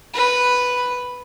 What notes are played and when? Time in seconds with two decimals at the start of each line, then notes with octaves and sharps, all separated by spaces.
0.14 B4